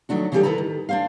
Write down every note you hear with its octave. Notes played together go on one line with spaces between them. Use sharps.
D#3 F#3 A3 D4 F#4
C#3 E3 G3 D#4 G4 A4
D#3 F3 E4 A4 B4 A#5
D#3
D4 C5 F5